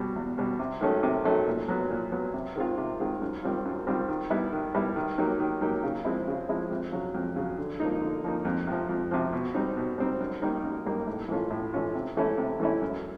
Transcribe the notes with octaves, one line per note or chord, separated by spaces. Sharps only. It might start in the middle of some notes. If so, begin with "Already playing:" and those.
Already playing: B2 G3
E2
B2 G3
C3
D#3 F#3 A3 C#4
C3
D#3 F#3 A3 C#4
A#2
F#3 B3
A#2
F#3 B3
C3
D#3 G#3 C4 F4
C3
D#3 G#3 C4 F4
F#2
D#3 G3 C4 F4
F#2
D#3 G3 C4 F4
D#3
G3 B3 E4
D#3
G3 B3 E4
D#3
F#3 A#3 D#4 G4
D#3
F#3 A#3 D#4 G4
C#3
F3 G#3 C4 E4
C#3
F3 G#3 C4 E4
F2
C#3 F#3
F2
C#3 F#3
D3
F3 A#3 D#4
D3
F3 A#3 D#4
F2
C3 F3
F2
C3 F3
B2
G3 C4 D#4
B2
G3 C4 D#4
F#2
D#3 G3 A#3 D#4
F#2
D#3 G3 A#3 D#4
A2
E3 A3 C#4 F4
A2
E3 A3 C#4 F4
C3
E3 A3 C#4 E4
C3
E3 A3 C#4 E4
F#2